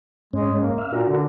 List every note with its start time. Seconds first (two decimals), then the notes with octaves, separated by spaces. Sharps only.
0.33 G#2 G#3 C#4
0.58 A#3
0.78 E5 F5
0.93 A#2 D4 F#4 A#4
1.08 D3